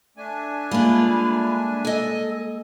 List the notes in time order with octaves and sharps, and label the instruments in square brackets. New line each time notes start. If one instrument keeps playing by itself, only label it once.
[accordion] A3 D4 G#5
[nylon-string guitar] G3 G#3 A#3 [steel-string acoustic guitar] F4 D5 [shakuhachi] B5
[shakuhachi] A4 [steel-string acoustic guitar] D#5 G#5